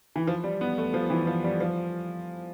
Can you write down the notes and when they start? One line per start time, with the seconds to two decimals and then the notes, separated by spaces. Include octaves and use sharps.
0.16 E3
0.27 F3
0.44 G3
0.61 B3
0.78 A3
0.94 F3
1.10 E3
1.27 F3
1.44 G3
1.60 F3